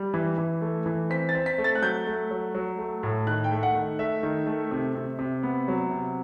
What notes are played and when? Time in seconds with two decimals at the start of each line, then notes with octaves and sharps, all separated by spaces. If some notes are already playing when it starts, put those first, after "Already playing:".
Already playing: G3
0.14 E3
0.38 E3
0.61 A3
0.86 E3
1.10 C4 B6
1.29 A6
1.35 C4
1.46 B6
1.58 A3
1.64 A6
1.75 F#6
1.82 F#3 G6
2.07 A3
2.31 F#3
2.55 F#3
2.79 A3
3.03 A2
3.27 D#3 F#6
3.44 G5
3.51 A3
3.63 F#5
3.75 D#3
3.99 A3 E5
4.23 D#3
4.47 A3
4.71 C3
4.95 C3
5.19 C3
5.43 B3
5.68 F#3
5.91 C3